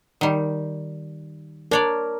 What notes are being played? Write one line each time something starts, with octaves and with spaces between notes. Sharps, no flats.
D#3 G3
D4 A#4 C#5 D5